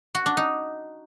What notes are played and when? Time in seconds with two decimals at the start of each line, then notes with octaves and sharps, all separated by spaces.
0.15 F#4
0.26 D4
0.37 D#4